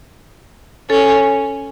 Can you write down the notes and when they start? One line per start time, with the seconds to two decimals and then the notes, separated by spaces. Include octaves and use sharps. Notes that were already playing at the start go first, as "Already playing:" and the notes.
0.90 C#4 A4